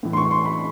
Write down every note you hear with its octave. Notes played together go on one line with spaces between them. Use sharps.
A2 E3
C6
C#6
C6
B5